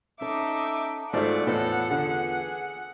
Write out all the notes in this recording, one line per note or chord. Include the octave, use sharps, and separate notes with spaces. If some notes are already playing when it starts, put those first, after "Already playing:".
C#4 D#4 A4 E5 D6
G#1 A3 F4 F#4 C5 D5 F#5
E2 A2 B3 F4 A4
D3 G#4